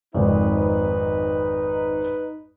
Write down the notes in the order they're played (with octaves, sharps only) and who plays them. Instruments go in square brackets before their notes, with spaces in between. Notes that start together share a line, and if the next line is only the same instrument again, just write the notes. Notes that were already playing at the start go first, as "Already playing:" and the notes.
[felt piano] G#1 F2 [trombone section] D#4 B4